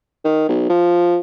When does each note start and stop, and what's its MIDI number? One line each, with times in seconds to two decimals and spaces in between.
0.25 0.48 51
0.49 0.65 35
0.70 1.19 53